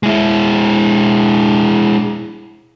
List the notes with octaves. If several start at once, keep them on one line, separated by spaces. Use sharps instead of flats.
G#3 E4